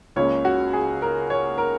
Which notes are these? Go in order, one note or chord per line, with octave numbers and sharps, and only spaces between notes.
C#2 C#3 A#3 C#4 C#5
F#4
G#4
A#4
C#5
A#4